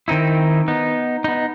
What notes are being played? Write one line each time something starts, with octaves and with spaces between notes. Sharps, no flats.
D#3 C4 D#4 E4
B3 D#4
B3 D#4